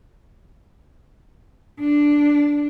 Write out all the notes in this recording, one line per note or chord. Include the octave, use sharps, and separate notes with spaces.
D4